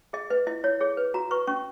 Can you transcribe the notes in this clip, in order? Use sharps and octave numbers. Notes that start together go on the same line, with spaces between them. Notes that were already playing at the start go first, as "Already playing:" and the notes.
G#4 D#5
B4 D#5
E4 D#5
E4 C#5
G#4 C#5
B4
F#4 A#5
B4 C#6
C#4 C#6